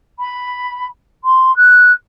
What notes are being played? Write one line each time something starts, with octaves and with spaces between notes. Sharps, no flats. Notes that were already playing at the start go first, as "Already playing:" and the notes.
B5
C6
F#6